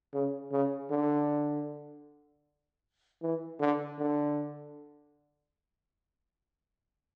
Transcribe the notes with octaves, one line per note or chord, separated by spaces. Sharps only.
C#3
C#3
D3
E3
D3
D3